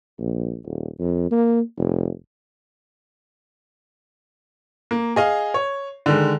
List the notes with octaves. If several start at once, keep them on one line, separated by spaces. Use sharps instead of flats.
A#1
D#1
F2
A#3
F1
A#3
G#4 D#5 F5
C#5
D3 D#3 G#3